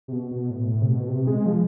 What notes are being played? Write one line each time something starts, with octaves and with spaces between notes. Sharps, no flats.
C3
B2
B2
A2
A2
C3
B2
C3
G#3
F3